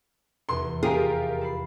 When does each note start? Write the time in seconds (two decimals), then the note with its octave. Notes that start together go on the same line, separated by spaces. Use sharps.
0.49 F1 E2 C6
0.83 F4 G4 G#4 A#4 C7
1.41 A4 B5 C7